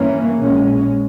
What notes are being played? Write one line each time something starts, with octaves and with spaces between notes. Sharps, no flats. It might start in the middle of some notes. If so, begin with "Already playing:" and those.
Already playing: G2 E3 A#3 C#4
A#1 A#2 G#3 C#4